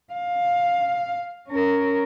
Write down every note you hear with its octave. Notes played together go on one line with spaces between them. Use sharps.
F5
C#4 A#4